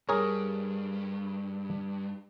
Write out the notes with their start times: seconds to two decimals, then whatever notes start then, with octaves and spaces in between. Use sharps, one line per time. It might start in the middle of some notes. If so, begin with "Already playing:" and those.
0.09 G2 G#4 A#4 C#5